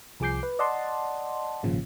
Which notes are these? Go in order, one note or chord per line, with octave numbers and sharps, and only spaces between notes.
C2 F3 G#4 D6 G6 C7
B4
D5 D#5 F#5 A5 C6
G#1 A#2 C#3 F3